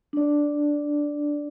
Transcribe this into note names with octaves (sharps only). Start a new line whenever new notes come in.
D4 D5